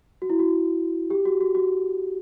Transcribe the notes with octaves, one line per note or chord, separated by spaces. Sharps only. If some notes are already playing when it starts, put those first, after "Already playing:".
F#4
E4
F#4
G4
F#4
F#4
F#4